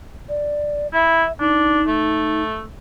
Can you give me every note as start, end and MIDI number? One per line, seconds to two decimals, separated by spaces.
0.29 0.87 74
0.94 1.24 64
0.94 1.32 76
1.40 1.81 62
1.40 2.43 63
1.87 2.62 57